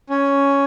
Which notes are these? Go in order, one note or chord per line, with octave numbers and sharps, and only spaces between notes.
C#4